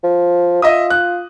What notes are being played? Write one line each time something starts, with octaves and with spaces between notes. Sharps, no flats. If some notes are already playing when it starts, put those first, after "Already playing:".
F3
F4 D#5 E5 D#6
F#6